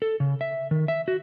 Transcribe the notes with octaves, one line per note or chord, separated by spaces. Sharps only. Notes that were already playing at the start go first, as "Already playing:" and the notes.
A4
C#3
E5
D#3
E5
F#4